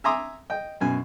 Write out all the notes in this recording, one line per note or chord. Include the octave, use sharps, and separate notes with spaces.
E5 G#5 A#5 C6 D6 D#6
D#5 G5
F#2 B2 G#5